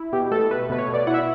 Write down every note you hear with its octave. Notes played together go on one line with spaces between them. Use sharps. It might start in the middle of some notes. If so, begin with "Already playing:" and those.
Already playing: E4
B2 G4
A3 A4
A3 B4
B2 B4
C#5
B2 D5
E4 F#5
E5